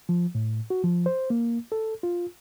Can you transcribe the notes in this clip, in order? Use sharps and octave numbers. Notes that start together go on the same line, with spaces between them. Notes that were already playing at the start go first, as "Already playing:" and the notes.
F3
A2
F#4
F3
C5
A#3
A4
F4